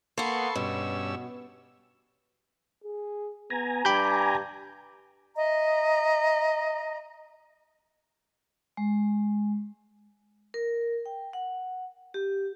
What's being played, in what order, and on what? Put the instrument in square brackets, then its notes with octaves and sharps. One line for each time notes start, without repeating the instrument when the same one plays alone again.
[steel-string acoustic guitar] A#3 B3 [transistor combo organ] A4 C6 C#6
[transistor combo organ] G2 C#4 E6 [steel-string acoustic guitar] B2
[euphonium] G#4
[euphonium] B3 [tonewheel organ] G#5 A#5
[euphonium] G2 [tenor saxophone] G4 [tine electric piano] G5 B5 G6
[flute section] D#5 E5 A#5
[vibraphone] G#3
A#4
G5
F#5
G4